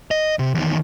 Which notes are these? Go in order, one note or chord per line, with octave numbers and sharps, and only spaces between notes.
D#5
C3
E2 D#3